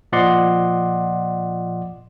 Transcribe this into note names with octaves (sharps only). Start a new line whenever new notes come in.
A#2 F3 D5 D#5 F#5 C6